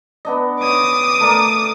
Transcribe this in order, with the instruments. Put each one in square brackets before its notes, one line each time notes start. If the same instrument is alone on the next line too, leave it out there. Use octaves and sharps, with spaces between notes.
[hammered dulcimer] B3 D4 D#5
[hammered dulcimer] C#5 [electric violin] D6 D#6
[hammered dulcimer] A3 A#4 D5